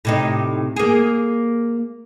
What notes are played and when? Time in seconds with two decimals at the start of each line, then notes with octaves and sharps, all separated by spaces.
0.05 A2 C3 D#4
0.76 A#3 G#4